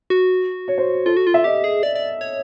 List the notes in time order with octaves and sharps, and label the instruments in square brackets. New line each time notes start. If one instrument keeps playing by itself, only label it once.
[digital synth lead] F#4
[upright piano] C#5
C5
[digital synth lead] F4 [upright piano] A4
[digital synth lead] F#4
F4
[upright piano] E5
[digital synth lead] G4 [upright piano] D#5
[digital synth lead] G#4
D5
D5
C#5